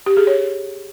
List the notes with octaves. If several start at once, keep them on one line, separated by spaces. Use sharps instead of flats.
G4
G#4
C#5